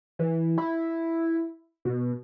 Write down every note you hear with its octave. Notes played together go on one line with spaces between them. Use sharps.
E3
E4
B2